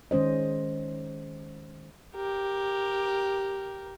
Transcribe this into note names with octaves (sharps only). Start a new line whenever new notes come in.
D#3 G#3 C#4 C5 D#5
G4 A#4